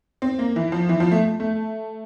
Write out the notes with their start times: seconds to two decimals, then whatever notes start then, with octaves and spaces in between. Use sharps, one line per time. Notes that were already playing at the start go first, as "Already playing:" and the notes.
0.22 C4
0.39 A#3
0.56 E3
0.72 F3
0.89 E3
1.00 F3
1.12 A3
1.40 A3